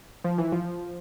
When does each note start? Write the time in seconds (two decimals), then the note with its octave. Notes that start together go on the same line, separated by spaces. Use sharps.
0.24 F3
0.38 E3
0.52 F3